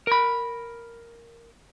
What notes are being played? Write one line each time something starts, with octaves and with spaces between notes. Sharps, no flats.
A#4 B5